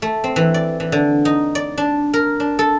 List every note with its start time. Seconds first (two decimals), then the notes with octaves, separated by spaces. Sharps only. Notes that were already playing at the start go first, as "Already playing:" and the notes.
0.02 A3
0.24 C4
0.36 E3
0.54 D5
0.80 E3
0.92 D3
1.25 D#4
1.55 D5
1.78 D4
2.14 A#4
2.40 D4
2.59 A4